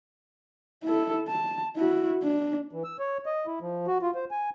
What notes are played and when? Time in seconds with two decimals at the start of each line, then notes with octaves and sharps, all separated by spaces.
0.84 E4 A4
1.28 A5
1.77 E4 F#4
2.23 D4
2.72 E3
2.84 E6
2.99 C#5
3.26 D#5
3.47 E4
3.61 F3
3.87 F#4
4.02 F4
4.15 C5
4.31 G#5